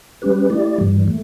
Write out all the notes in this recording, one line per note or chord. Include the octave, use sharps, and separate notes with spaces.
G3 C#4 G4 B4
A3 E4 G4 D5
G2 E3 G3
A3